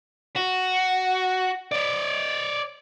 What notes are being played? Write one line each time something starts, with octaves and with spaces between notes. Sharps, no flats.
F#4
C#5 D5